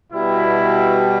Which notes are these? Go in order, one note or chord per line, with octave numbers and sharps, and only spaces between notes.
B2 G3 E4